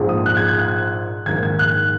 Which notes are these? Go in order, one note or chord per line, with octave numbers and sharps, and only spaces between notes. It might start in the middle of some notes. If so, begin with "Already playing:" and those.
Already playing: A#1 G#2 F3 G#3
D#6
F#6
G#6
G#6
F#6
A#1 G#2 D#3 G#6
G#6
F#6